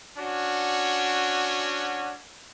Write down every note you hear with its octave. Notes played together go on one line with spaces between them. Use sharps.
C#4 D4 F#4